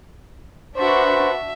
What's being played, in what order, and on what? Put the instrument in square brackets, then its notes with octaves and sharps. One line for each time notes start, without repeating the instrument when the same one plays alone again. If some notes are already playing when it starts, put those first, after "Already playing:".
[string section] D4 F#4 [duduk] B4 [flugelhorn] C5 [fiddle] E5